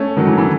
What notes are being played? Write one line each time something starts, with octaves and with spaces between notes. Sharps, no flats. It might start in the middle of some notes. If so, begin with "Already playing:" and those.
Already playing: A3 C#4
D#3 F#3
E3
E3